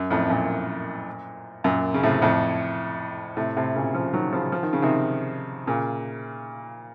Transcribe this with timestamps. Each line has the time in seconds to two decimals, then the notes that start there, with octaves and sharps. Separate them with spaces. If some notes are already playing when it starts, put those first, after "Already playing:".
Already playing: F#2
0.10 F2 A2
0.30 F#2 A#2
1.64 F#2 A#2
1.94 C#3
2.03 A2 C3
2.22 F2 A2
3.37 A2 C3
3.57 A2 C3
3.75 A#2 C#3
3.94 C#3 F3
4.14 D#3 F#3
4.33 C#3 F3
4.52 F3
4.63 D#3
4.73 C#3
4.82 C3 D#3
5.67 A#2 C#3